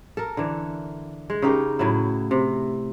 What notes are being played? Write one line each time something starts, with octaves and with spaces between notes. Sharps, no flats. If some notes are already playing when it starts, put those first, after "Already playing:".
A4 A#4
D3 E3
G#3
C#3 D#4 G4 A#4
A2 F#3 E4
C3